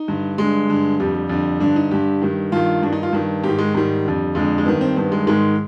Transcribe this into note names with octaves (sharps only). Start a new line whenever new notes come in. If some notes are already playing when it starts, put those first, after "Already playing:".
Already playing: D#4
G2 D3
G2 D3 G#3
G2 D3
F2 D3 G3
G3
F2 D3
G2 D3 D4
D#4
G2 D3 G4
G2 D#3
G2 D#3 F4
G2 D#3 D4
D#4
F4
G2 D#3
G#2 D#3 G4
G#3
G#2 D#3 G3
F2 D3
F2 D3 G#3
G#3
G2 D#3 B3
C4
G2 D#3 B3
G#3
G#2 D#3 G#3